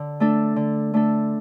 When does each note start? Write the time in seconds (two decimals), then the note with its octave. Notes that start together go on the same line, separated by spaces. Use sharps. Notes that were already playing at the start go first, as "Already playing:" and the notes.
Already playing: D3
0.20 A3 D4 A4
0.56 D3
0.94 A3 D4 A4